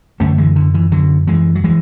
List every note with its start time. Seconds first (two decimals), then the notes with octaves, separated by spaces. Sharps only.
0.20 F#2 D3 A3 C#4
0.38 E3 G#3
0.56 D3
0.74 E3
0.92 D3 F#3
1.27 E3 G#3
1.55 F#3
1.64 E3 G#3